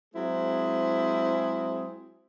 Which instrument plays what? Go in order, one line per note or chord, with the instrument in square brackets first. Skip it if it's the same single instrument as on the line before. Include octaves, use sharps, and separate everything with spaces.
[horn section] F#3 G#3 C4 E4 G#4 C5